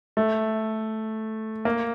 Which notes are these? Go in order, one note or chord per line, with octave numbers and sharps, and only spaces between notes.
A3
A#3